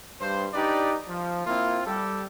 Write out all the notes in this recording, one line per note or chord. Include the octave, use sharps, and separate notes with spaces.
G2 C5
D4 D#4 G4 B4 D5
F3
A#3 C4 E4 F4
G3 G4 A4